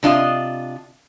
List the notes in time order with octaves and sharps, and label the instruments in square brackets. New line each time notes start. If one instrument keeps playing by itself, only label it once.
[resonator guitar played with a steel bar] C3 D4 F4 D#5